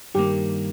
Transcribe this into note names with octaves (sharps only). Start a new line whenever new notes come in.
G2 D#3 A#3 G4